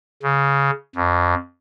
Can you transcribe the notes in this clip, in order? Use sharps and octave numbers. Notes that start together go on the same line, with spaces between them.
C#3
F2